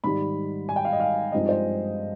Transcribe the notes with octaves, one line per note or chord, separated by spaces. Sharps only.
G#2 D#3 G3 B5
G#5
G5
F5
D#5
F5
G2 F3 G#3 C4 D#4 D#5
C5